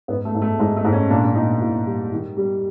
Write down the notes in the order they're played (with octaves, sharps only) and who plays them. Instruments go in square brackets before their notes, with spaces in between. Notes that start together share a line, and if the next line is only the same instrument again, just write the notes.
[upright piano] G#2 B3
A3
G#2
A3
G#2 G#3
A3
G#2
C#4
A#2 D4
D4
A#2 D#4
A#2 E4
G3
D#3
G3